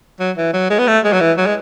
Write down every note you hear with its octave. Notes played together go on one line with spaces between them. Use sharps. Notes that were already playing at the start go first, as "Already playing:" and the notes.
F#3
E3
F#3
G#3
B3
A3
G#3
F#3
E3
F#3
G#3